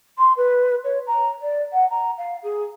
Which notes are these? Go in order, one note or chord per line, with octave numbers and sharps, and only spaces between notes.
C6
B4
C#5
A#5
D5
F#5
A#5
F5
G#4